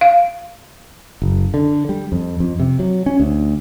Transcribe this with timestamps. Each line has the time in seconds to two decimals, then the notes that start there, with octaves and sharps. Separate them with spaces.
0.01 F5
1.22 F#1
1.54 D3
1.89 G3
2.12 F2
2.40 F2
2.60 C3
2.79 F#3
3.06 C#4
3.20 D2